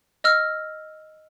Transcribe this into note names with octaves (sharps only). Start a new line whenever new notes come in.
D#5 E6 F6